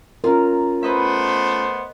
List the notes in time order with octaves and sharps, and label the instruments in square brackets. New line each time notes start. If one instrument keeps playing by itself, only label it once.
[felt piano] C#4 F4 [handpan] A#4
[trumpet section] A3 B3 C5 [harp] B4 D#5 E5